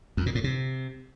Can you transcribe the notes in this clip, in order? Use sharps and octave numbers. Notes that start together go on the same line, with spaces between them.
F2
A#2
A2
C3